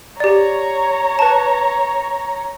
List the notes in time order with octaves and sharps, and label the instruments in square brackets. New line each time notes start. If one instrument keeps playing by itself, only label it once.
[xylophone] G4 D5 [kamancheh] C#5 A#5
[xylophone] B4 A5